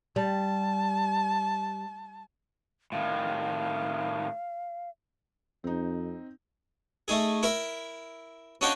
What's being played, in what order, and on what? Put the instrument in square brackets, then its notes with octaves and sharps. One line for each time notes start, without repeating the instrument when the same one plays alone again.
[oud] G3 [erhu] A5
[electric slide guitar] A2 D#3 [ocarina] F5
[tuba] F2 [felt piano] C4 D#4
[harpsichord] A3 D#4 G#4
E4 A#4 E5
C#4 D4 F#4 D#5 F5 G5